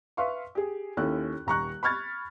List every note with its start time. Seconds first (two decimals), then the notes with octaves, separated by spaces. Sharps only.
0.17 B4 E5 F5 C6 C#6
0.55 G4 G#4
0.97 D#2 C#4 E4 A4 F#6
1.46 D#1 A#5 C#6 F#6
1.83 B5 C#6 F6 G#6 A6